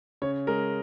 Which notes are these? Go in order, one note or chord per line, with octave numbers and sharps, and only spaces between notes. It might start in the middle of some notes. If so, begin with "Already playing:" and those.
C#3 C#5
G#3 A#4